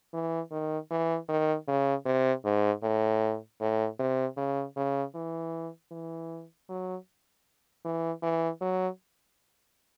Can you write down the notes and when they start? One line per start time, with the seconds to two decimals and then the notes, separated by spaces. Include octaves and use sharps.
0.14 E3
0.51 D#3
0.91 E3
1.29 D#3
1.68 C#3
2.05 C3
2.45 G#2
2.83 A2
3.61 A2
3.99 C3
4.37 C#3
4.76 C#3
5.15 E3
5.91 E3
6.69 F#3
7.85 E3
8.22 E3
8.61 F#3